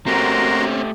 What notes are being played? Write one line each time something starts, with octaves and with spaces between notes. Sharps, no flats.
A3 C4 C#4 F#4 G4 A#4 A#5 C6